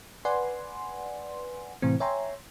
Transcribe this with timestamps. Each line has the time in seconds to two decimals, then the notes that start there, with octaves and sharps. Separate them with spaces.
0.25 B4 D5 F#5 G#5 C6
1.82 A2 C3 E3 C4
2.00 C#5 E5 G5 G#5 A#5 C6